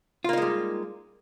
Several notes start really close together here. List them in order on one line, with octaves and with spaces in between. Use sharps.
F4 A#3 D#4 G#3 G3